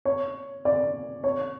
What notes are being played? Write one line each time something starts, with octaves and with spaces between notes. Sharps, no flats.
C#5
D5
C#5